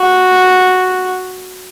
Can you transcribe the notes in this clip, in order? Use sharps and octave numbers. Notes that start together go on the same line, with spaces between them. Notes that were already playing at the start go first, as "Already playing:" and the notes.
Already playing: F#4